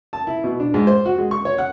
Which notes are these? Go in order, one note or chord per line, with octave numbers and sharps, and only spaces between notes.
A5
E4
B2
D4
G#2
C5
F#4
G#3
C#6
C#5
F#5